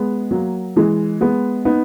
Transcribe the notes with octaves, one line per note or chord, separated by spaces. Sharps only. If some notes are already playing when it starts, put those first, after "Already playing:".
Already playing: G#3 B3
F#3 A#3
E3 G#3
G#3 B3
B3 D#4